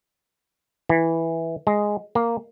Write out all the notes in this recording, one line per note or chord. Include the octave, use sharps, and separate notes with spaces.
E3
G#3
A#3